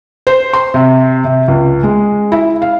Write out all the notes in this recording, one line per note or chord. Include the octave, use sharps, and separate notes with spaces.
C5
C6
C3
C3
C#2
G#3
E4
F5